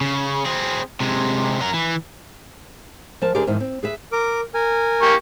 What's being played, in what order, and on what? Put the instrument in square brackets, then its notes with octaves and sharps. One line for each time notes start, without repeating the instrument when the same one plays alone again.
[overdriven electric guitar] C#3
C4 G#4
C3 G#3
F#3 A#4
E3
[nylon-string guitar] F3 A#4 A5
D2 D3 G4 G#4 A#4 D5
F2 G#2 D#3 E3
C4
G#4 B4 E5
[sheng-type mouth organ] A#4 D6
A#4 G#5
[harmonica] A#3 G4 C#6